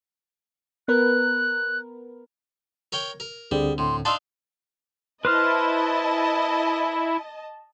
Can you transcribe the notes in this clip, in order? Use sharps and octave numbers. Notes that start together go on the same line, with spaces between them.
B3 A#4 B4 F#6
A#4 C#5 G5
A#4
D2 D3 G3 C4 G#4
A2 C6
D4 D#4 F5 A5 C6 E6
E4 B4 C5 D#5 A5 F6